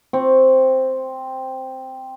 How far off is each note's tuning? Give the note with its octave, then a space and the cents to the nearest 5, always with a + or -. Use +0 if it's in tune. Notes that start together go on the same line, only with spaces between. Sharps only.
C4 +0 C#6 +0